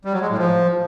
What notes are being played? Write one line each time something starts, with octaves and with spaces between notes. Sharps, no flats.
G3
F#3
G#3
A2
F3